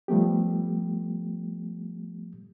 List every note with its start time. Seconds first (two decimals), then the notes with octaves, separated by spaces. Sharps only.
0.08 F3 G3 A3 B3 G4